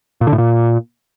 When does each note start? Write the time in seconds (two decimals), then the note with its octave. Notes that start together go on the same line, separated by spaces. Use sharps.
0.21 A#2
0.27 D3
0.33 A2
0.38 A#2